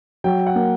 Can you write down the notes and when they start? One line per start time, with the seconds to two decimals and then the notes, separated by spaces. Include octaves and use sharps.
0.24 F#3 G5
0.47 F#5
0.55 A#3